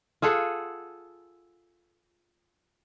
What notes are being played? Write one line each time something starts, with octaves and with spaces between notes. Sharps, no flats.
F4 G#4 A4 F#5